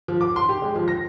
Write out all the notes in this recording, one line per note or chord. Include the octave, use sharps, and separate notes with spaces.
F3
D6
C6
G4
G#3
F3
A#6